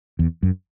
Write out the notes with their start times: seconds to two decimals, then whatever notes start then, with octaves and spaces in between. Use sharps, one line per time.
0.19 E2
0.43 F#2